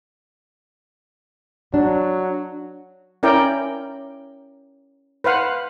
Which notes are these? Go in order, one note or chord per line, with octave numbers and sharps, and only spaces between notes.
F#3 D4
C#4 E4 A#4 D5 G5
B4 C5 F5 F#5